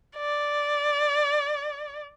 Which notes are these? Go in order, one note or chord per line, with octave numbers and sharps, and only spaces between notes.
D5